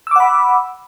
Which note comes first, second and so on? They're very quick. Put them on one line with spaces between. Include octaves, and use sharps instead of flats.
E6 D6 F#5 B5